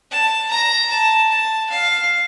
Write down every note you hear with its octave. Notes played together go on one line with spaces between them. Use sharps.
A5
A#5
A5
A5
F5